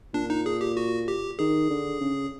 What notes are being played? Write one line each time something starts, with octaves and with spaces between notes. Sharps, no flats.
A#2 D4
D#4
G#4
G4
F#4
G4
D#3 G#4
D3
C#3